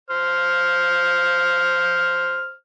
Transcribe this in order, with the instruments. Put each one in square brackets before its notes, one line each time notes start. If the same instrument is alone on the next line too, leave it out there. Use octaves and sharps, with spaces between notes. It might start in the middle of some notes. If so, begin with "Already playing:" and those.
[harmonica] C5 F6